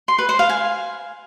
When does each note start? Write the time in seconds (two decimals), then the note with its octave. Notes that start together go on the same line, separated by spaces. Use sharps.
0.08 C6
0.18 B4
0.29 C5
0.39 F5
0.49 G#5